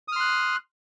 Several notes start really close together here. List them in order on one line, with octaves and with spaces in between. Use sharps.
D#6 F6 C6 F#6